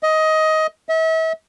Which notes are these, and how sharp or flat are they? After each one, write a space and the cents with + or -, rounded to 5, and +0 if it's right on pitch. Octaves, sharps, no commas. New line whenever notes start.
D#5 +15
E5 -40